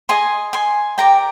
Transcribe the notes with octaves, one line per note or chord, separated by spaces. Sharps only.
G#4 D#5 G#5 C6
G#5 C6
G4 A#4 D5 G5 A#5